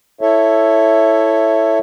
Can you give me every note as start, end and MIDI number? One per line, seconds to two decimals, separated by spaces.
0.21 1.79 64
0.21 1.79 69
0.21 1.79 73
0.21 1.79 76